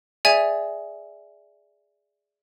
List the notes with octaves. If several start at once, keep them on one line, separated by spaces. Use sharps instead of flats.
G#4 D5 E5 G#5 G#6